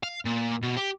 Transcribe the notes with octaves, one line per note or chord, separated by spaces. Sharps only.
F5
A#2
B2
G4